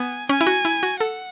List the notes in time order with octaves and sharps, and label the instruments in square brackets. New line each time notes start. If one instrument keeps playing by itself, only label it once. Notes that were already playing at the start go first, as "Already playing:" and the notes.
Already playing: [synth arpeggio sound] B3 [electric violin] G#5
[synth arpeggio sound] C#4 [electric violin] G#5
[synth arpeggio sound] E4
F#4
E4
F#4
[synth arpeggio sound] A4 [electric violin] F#5